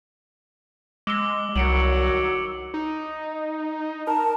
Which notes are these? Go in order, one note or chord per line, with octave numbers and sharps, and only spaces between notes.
G#3 D6 E6 G7
C2 D#3 F#3 C#7 D7 F#7
D#4
A#4 A5